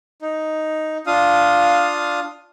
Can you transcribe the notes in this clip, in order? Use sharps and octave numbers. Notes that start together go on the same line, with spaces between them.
D#4
D4 F4 F5 D#6